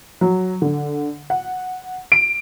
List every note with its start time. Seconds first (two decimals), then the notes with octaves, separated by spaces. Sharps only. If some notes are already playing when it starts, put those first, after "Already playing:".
0.21 F#3
0.62 D3
1.30 F#5
2.12 D7